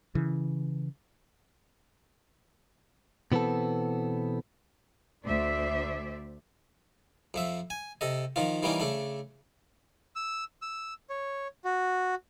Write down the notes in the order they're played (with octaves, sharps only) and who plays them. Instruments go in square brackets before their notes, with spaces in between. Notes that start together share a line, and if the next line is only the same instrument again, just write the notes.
[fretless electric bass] C#3 E3
[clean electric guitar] B2 E3 B3 C4 A4
[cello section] D2 C5 D5 E5
[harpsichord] F2 F3 E5
G#5
C3 A4 D#5
D#3 F3 F4
E3 G3 A#3 C#4 D#4
C#3 A3 D4
[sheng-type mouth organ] E6
E6
C#5
F#4